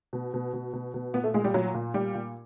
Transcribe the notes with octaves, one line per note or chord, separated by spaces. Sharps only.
B2
B2
B2
B2
B2
A#2 B3
A3
A#2 G#3
G3
A#2 F#3
A#2
A#2 G3
A#2